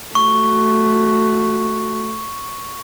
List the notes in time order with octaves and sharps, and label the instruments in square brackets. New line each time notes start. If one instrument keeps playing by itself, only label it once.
[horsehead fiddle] A3 F#4 [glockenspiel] C#6